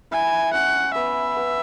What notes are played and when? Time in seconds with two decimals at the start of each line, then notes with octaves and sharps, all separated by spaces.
0.11 E4 G#5
0.53 C#4 F#5
0.94 B3 E5
1.37 B3